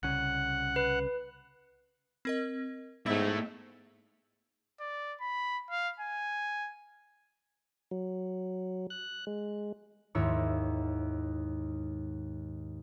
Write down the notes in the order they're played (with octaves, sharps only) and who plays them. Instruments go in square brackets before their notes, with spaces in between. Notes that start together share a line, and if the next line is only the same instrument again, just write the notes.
[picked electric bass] C2 C#3 [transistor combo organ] F#5
[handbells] B4
[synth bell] C4 A#4 D#5
[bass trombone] G#2 [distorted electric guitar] A3 E4 [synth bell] B3 D#5
[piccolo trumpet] D5
B5
F5
G#5
[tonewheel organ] F#3
F#6
G#3
[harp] D#2 G#2 E4 C#5 F6